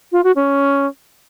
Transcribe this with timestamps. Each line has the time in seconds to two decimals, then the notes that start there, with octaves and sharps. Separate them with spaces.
0.12 F4
0.24 F#4
0.36 C#4